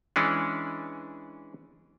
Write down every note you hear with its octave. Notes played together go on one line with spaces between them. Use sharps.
E3 G#3 C#4 D4